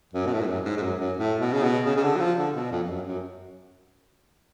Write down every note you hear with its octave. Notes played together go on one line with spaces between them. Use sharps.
F#2
B2
A2
G#2
F#2
G#2
G#2
F#2
F#2
A2
B2
C#3
B2
C#3
C#3
D3
F#3
F3
D3
B2
F2
F2
F#2
F#2